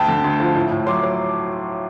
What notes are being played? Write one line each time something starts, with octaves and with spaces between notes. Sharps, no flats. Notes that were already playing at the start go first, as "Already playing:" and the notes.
Already playing: D2 G5 A5
D3
D2
F3
A2
A2
F#3 C6 D6
F#3